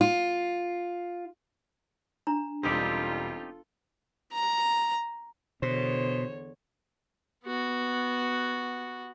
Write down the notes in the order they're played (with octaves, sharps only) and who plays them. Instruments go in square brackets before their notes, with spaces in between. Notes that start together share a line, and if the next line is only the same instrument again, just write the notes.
[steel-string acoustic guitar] F4
[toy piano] D4 A#5
[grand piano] E1 G3 [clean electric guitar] C4 D#4 G4 [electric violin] F4 A4
[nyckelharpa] A#5
[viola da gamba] E2 D3 C#5 [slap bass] B2 [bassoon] C5
[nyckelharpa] B3 F#4